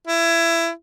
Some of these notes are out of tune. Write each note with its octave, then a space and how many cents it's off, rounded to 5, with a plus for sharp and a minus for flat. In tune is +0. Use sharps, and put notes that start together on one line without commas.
E4 +20